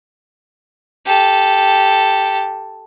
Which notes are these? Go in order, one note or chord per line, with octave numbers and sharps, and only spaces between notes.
G4 A4